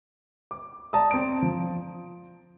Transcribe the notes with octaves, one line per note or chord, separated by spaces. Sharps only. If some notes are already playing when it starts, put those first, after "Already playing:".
D6
D5 A5 A#5 D#6
C4 D7
F3